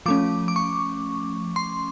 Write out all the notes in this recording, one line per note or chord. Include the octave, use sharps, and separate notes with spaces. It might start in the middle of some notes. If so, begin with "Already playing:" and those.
F3 A3 C#4 D6
D6
C#6
C6